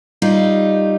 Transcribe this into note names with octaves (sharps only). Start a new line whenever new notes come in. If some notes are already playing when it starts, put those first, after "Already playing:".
G3 D#4 F4